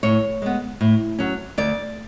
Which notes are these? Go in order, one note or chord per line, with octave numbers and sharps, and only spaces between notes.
A2 C#5
G#3 B3
A2
F#3 C#4
D2 D5